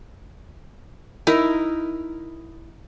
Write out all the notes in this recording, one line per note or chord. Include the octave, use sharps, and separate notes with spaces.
D#4 E4 A#4